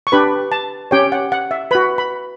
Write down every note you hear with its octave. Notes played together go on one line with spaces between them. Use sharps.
C#6
D4 G4 B4 B5
A5
C#4 G4 C#5 G5
F#5
F#5
E5
F#4 B4 B5
B5